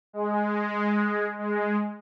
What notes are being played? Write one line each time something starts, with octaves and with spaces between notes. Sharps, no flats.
G#3
G#3